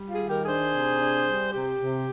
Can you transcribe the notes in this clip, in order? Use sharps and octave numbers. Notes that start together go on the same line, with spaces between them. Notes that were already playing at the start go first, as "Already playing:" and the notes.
Already playing: G3
F4 G#4
D#3
G4 A#4
D4 G#4 C5
C3
D4
G3
C3 G4
C3